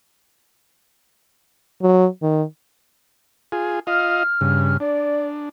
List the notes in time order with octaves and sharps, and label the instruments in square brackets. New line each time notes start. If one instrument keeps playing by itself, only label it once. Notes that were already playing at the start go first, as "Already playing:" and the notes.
[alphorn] F#3
D#3
[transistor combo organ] F4 G#4
[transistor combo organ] F4 D#5 F5 [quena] F6
[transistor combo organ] G2 C#3
[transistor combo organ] D4 [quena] D5